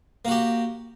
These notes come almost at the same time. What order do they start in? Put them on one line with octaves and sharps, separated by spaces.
A#3 F#4 G4